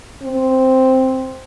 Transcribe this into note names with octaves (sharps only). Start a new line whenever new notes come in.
C4